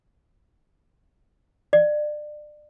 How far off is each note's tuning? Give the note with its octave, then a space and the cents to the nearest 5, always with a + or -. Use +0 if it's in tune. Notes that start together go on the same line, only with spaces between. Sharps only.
D5 +30